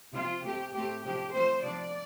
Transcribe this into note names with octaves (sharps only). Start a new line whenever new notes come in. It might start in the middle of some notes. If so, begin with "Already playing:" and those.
C3 F3 C4 F4
C3 A3 C4 G4
A2 A3 C4 G4
C3 F3 D4 G4
F3 A3 C4 C5
C3 F3 D4 D5